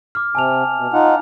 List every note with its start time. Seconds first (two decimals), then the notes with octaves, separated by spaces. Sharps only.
0.15 D6 F6
0.35 C3 G#5 A5 F7
0.78 B2
0.93 D#4 F4 F#5